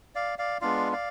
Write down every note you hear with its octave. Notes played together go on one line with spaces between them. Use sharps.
D5 F5
D5 F5
G#3 B3 D4 F4 D5 F5
D5 F5